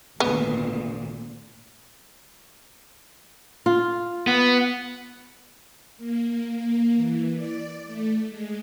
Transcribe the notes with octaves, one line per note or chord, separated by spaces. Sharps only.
G#1 D2 A#2 B3
F4
B3
A#3
A#3
E3
D5
A3
G#3